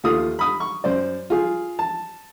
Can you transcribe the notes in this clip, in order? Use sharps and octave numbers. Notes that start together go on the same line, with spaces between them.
D#2 A3 F4 D#6
B5 D#6
C#6
F#2 C5 D5
F4 G#4
A5